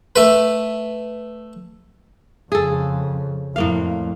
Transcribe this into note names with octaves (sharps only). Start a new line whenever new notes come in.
A3 B4
F2 C#3 G#4 A4
F2 A2 A#3 F5